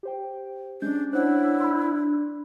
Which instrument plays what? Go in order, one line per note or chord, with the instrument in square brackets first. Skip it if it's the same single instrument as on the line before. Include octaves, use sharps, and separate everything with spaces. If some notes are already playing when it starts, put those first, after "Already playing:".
[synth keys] G4 C5 G5
[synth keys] G#3 C#4 G6 [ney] D4
[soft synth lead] D4 [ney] E4 [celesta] C5 C#5 F#5 [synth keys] F#6
[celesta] B5 C6